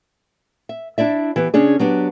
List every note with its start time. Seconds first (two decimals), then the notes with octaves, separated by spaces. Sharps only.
0.69 E5
0.98 D4 E4 D5 E5
1.36 E3 B3 G4
1.54 C#3 C#4 D4 G#4
1.79 F#3 B3 D4 G4